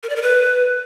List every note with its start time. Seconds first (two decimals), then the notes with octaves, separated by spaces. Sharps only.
0.03 A#4
0.09 D5
0.16 A#4
0.22 B4